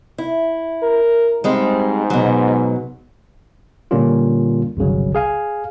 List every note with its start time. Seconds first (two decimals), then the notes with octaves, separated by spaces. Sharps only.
0.18 E4
0.83 A#4
1.44 G#2 G3 G#3 C4
2.10 B2 F#3
3.91 A#2 D3 G3 A#3 C#4 F4
4.77 G1 C2 C#3 F#3
5.15 G#4 F5 G#5